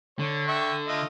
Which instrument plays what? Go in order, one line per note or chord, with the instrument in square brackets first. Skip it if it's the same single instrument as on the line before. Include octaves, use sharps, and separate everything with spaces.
[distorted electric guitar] D3 [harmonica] C#5
[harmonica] E5 G5 C#6
A3 F4 D#5